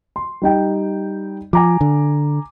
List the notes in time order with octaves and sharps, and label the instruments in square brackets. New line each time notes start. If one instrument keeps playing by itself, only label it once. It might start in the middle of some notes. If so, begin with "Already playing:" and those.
[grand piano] C6
G3 D#4 G5
[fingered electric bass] F3 [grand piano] G#5 A#5 D6
[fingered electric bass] D3